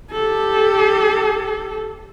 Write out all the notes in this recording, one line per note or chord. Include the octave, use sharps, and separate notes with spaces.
G4 A4